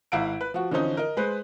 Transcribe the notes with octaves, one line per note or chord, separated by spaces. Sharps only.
G#1 E4 F5 F#5 D7
B4
F3 F#4
D3 E3 F3 C4 C#4 D#4
A#4 D#5
G#3 B4 C5